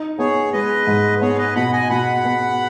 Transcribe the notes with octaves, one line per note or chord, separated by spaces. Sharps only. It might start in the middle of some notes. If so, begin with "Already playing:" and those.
Already playing: D#4
B3 G#4 C#5
G#3 B4 D#5
G#2
B3 G#4 C#5
B4 D#5
B2 F#5 B5
D#5 G#5
B2 F#5 B5
B3